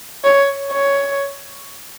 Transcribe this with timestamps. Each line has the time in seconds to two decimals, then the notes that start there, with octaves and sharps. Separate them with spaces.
0.24 C#5
0.72 C#5